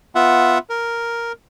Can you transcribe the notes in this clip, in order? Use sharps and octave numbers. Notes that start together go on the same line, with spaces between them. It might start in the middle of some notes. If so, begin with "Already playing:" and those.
B3 F4 E5 F#5
A#4